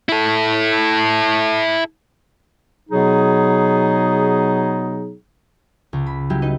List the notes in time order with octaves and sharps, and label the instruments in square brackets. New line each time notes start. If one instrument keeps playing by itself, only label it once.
[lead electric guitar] E4 A4
[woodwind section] B2 F#3 B3 D#4 G#4
[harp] C#2
B5
F#3 G3 E4 G4
D#4 B4 D#5